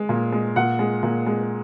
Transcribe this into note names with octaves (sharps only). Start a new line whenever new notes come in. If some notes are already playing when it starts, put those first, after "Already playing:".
Already playing: G#3
A#2
G#3
A#2 F#5
G#3
A#2
G#3